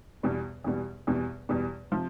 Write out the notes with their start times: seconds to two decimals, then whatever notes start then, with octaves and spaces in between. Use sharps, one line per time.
0.23 E2 B2 G3
0.64 E2 B2 G3
1.07 E2 B2 G3
1.49 E2 B2 G3
1.91 C3 F3